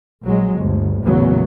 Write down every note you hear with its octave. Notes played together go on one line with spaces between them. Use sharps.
A#1 F#3 G#3
G1 D2
A1 E2 A#2 C#3 F#3 B3